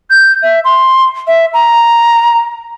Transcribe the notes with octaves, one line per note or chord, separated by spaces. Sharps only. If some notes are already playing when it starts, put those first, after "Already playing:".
G6
E5
C6
E5
A#5